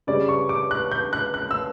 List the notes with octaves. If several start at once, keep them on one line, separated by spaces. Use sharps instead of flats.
C#3 G3 C#4 D5
C#6
D6
F#6
G6
F#6
F#6
E6